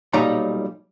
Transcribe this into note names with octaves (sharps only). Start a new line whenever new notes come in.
B1 A#2 G3 D#4 C#5 A#5